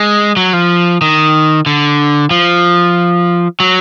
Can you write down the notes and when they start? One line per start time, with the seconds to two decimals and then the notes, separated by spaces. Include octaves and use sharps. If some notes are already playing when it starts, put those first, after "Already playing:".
Already playing: G#3
0.37 F#3
0.53 F3
1.01 D#3
1.66 D3
2.31 F3
3.60 F#3